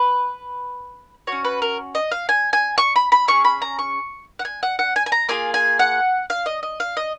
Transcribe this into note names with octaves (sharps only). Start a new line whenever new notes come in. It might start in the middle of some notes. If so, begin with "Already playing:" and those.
Already playing: B4
C#4 F#4 C#5
B4
A#4
D#5
F5
G#5
G#5
C#6
B5
B5
C#4 F4 G#4 C#6
B5
A#5
C#6
F#5
G#5
F#5
F#5
G#5
G#5
A#5
A#3 F4 G#4 G#5
G#5
F#5
F5
D#5
D#5
F5
D#5